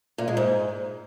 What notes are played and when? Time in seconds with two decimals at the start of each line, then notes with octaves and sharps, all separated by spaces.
0.18 A#2
0.28 G#3
0.37 G#2